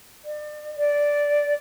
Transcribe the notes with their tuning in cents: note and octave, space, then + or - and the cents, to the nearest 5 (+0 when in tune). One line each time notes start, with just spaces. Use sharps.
D5 +40
D5 -5